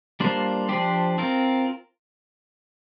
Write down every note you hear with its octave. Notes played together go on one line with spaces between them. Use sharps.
G3 A#3 D4 F4 C5
F3 D4 G4 C5
C4 F4 A#4